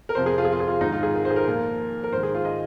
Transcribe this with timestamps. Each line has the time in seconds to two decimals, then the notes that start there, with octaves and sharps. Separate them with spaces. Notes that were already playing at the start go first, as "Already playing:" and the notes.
0.09 A#4
0.15 F2 C3 F3 C5
0.26 G#4
0.38 F4
0.45 G#4
0.52 F4
0.60 G#4
0.68 F4
0.81 G#2 D#3 D#4
0.92 F4
1.03 G#4
1.14 A#4
1.25 C5
1.30 G#4
1.36 A#4
1.47 A#2 F3
2.04 A#4
2.12 G#2 C5
2.17 D#3
2.23 G#4
2.35 F4
2.45 D#5